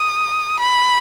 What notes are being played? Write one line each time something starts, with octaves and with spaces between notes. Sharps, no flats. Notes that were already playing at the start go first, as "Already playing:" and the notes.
Already playing: D#6
B5